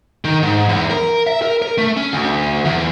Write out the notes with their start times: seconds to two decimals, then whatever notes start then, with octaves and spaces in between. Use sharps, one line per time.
0.25 D#3
0.43 G#2
0.69 E2
0.90 A#4
1.27 E5
1.42 A#4
1.62 A#4
1.78 A3
1.97 C#4
2.12 D2
2.65 E2